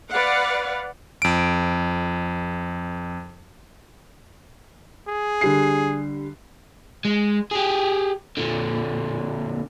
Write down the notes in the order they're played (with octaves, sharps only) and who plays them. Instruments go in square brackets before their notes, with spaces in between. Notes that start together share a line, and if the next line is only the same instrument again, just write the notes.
[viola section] B4 D5 F5 F#5
[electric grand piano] F2 D7
[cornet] G#4
[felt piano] D3 G3 C7
[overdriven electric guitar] G#3
G4 G#4
A#2 D3